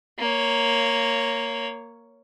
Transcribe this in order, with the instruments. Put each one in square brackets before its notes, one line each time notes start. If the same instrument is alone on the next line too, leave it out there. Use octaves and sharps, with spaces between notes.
[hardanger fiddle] A#3 C#5